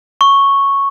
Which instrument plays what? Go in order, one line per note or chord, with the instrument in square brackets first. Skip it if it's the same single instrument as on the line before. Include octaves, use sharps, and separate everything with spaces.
[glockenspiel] C#6